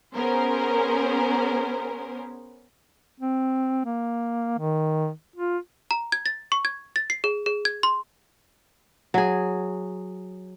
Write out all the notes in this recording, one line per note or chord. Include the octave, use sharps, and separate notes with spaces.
B3 C#4 G#4 A#4 C5
C4
A#3
D#3
F4
A#5
G#6
A6
C#6
G#6
A6
C7
G#4
G#4
G#6
C6
F#3 G#4